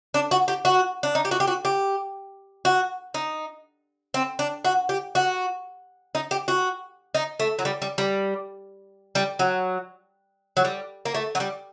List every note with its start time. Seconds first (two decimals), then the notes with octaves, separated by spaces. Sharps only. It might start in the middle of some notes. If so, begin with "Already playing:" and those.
0.14 D4
0.31 F#4
0.48 G4
0.65 F#4
1.03 D4
1.15 D#4
1.25 G4
1.31 F#4
1.40 G4
1.47 F#4
1.65 G4
2.65 F#4
3.14 D#4
4.14 C4
4.39 D4
4.65 F#4
4.89 G4
5.15 F#4
6.15 D#4
6.31 G4
6.48 F#4
7.15 D#4
7.39 A3
7.59 F#3
7.65 G3
7.82 G3
7.98 G3
9.15 G3
9.39 F#3
10.57 F#3
10.65 G3
11.05 A#3
11.14 A3
11.35 F#3
11.40 G3